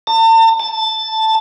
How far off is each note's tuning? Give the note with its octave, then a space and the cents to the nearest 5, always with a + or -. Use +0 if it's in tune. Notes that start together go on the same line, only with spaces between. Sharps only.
A5 +45
A5 +5